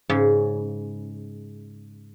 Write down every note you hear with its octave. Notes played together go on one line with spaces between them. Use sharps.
G#2 C#3